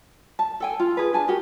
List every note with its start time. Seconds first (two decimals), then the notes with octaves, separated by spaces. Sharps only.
0.39 A5
0.60 A4 G5 G#5
0.80 F4
0.97 G#4 B4
1.13 D4 G#5 A5
1.28 F#4 G4 A#4